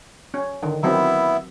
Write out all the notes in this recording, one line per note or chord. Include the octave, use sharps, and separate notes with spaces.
C#4
D3 D#3
D#3 F#3 B3 C4 E4 E5